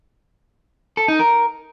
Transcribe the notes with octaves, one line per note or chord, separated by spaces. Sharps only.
A4
D#4
A#4